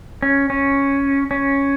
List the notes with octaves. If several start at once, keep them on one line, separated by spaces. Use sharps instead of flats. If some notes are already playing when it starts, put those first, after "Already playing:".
C#4
C#4
C#4